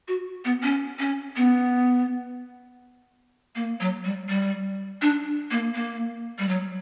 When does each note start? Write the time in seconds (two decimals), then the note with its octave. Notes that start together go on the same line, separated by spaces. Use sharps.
0.08 F#4
0.45 B3
0.63 C#4
0.99 C#4
1.37 B3
3.56 A#3
3.80 F#3
4.04 G3
4.29 G3
5.02 D4
5.51 A#3
5.75 A#3
6.39 G3
6.49 F#3